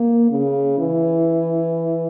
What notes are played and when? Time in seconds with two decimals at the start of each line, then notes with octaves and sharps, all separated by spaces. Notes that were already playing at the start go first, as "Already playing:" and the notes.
Already playing: A#3
0.31 C#3
0.78 E3